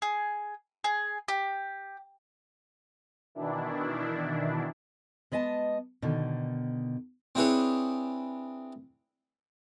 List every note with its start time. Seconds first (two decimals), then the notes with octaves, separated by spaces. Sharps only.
0.02 G#4
0.84 G#4
1.28 G4
3.35 B2 D#3 E3 D4 E4
5.32 G#3 B3 D#5 G#5 A5
6.02 B2 D3 D#3
7.35 C4 D4 E4 G#4 B4 C#5